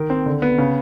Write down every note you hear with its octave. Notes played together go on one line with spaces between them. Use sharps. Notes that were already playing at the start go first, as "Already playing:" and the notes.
Already playing: D#3
C4
D3
B3
C#3